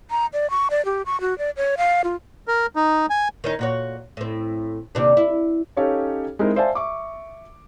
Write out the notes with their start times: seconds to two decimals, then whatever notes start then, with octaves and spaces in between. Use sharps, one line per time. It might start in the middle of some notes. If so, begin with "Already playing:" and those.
0.10 A#5
0.33 D5
0.50 C#6
0.71 D5
0.85 G4
1.06 C#6
1.21 F#4
1.38 D5
1.57 C#5
1.77 F5
2.04 F4
2.48 A#4
2.76 D#4
3.10 G#5
3.44 D#3 C#4 D#4
3.59 A#2 F#4 C#5
4.17 A2 C4
4.95 D#2 C3 D4
5.17 E4
5.77 C#4 D#4 G4 A4 C#5 F5
6.39 G#3 C4 D#4 E4 A#4
6.56 C5 D5 E5 F5 G#5 A5
6.75 E5 C#6 D6